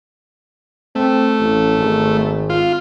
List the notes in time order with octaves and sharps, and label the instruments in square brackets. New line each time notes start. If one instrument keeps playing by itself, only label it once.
[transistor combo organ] A3 [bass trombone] C4
[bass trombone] A1
G#1
[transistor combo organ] F4